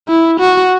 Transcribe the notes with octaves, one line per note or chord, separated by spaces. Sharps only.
E4
F#4